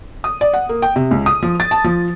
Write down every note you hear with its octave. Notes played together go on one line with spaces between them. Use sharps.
D#6
D5
F#5
A#3
G5
C3
C#2
D#6
F3
A6
A5
F3